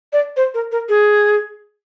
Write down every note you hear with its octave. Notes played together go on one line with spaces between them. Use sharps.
D5
C5
A#4
A#4
G#4